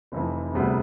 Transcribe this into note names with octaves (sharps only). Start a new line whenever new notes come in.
F1 F2 E3
E1 D2 C3 G3 B3